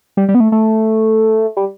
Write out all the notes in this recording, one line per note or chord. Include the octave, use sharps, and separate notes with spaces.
G3
G3
B3
A3
A3
G3